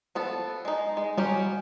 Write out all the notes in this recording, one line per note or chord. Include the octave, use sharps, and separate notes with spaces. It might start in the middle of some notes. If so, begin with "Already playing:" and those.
F3 B3 A4
G#3 D#4
G#3
F#3 G3 C#4 G4